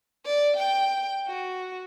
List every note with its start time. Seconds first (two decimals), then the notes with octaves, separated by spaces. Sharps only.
0.25 D5
0.57 G5
1.27 F#4